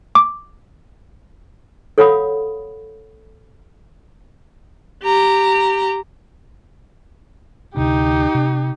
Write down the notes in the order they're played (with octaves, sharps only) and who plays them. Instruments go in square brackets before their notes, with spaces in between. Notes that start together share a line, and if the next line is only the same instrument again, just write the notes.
[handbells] D6
[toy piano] A4 C#5 F5 F#5 B5 D#6
[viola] G4 A#5
[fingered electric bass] D2 C3 D4 [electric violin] D#4 G4
[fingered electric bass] C3